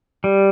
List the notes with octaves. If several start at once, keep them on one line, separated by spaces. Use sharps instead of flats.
G3